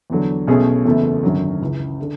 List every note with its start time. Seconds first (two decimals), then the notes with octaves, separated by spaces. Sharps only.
0.10 E2 D3 F#3
0.47 B1 B2 A3 C#4 G#4
0.85 F#1 E2 B2 A3
1.23 G#1 F#2 D3 F#3
1.60 C#2 C#3 E3
2.01 D3